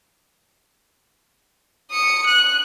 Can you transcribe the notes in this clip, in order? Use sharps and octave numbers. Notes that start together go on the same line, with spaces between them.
D#6 C#7
F#6